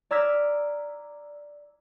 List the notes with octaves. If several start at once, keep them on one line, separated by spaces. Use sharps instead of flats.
D5 A#5 E6 F6 G#6 B6